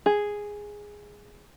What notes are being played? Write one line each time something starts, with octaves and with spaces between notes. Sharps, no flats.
G#4